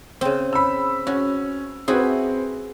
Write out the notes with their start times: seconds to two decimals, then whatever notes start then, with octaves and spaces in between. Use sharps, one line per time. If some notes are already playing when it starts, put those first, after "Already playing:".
0.21 C#3 C4
0.53 B5 E6
1.07 C#4 F#4
1.88 C4 E4 F#4 G#4 B4